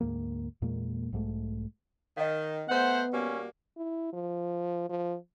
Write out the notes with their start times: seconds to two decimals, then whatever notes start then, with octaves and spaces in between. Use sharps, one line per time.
0.01 D2 G#2 G3 A#3
0.62 E2 A#2 G#3 A#3
1.12 B1 G#2 G#3 A3
2.17 D#3 D#5 F5
2.69 A3 B3 C5 F#5
3.13 B2 G3 A#3 C#4
3.77 E4
4.13 F3
4.90 F3